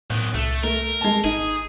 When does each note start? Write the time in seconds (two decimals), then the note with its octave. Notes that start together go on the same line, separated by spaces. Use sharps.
0.10 B1 A2 D#3 F#6
0.34 C2 A3
0.63 A3 A#4
1.01 G#3 A5
1.24 G#1 D#4 G#4